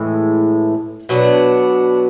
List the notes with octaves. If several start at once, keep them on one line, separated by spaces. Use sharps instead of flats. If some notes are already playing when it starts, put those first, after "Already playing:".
Already playing: A2 E3 G#3
B2 F#3 B3 D4